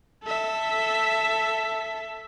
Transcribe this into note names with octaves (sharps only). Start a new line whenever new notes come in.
A4 E5